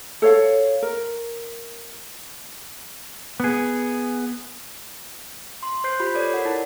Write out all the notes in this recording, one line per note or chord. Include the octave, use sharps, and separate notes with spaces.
A4 C#5 F5
A#4
B3 G#4
C6
C5 G6 C7
F4 G4 B5
A4 C#5 D5 B5
A#4 F#5
E4 A5